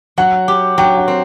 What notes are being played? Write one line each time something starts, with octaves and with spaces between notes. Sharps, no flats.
F#3 F#5
G4
F#3 G5
F#5
C4